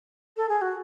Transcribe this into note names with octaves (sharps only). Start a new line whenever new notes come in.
A4
G#4
F#4